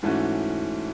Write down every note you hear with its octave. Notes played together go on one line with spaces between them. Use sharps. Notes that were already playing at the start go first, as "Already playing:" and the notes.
G#2 E3 A3 C#4 F#4